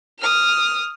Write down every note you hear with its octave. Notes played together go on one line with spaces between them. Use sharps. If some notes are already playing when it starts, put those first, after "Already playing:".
D#6 F6